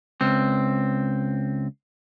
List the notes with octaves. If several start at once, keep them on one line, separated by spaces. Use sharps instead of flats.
C#2 C4